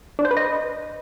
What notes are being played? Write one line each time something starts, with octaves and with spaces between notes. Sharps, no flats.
D4
C5
B4
D#5